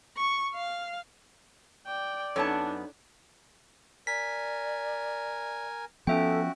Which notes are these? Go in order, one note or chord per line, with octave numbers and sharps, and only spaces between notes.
C#6
F5
D5 G5
F#2 B3 D4 D#4 A4 C#5 A5
A#4 D5 G#5 B6
F3 B3 C#4 F#4 A4 E5 G5